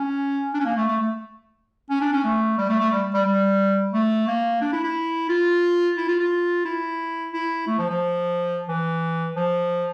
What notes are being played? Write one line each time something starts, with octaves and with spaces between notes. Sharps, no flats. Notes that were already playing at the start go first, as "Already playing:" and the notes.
Already playing: C#4
D4
C#4
A#3
A3
A3
A3
C#4
D4
C#4
A3
G3
A3
A3
G3
G3
G3
A3
A#3
D4
E4
E4
F4
E4
F4
F4
E4
E4
A3
F3
F3
E3
F3